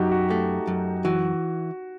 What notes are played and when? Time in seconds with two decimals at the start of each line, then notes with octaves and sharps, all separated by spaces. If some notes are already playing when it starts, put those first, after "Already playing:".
Already playing: F#2 D#4 F#4 G4
0.12 F#4
0.29 A3 G4
0.67 F#2
1.05 E3 F#4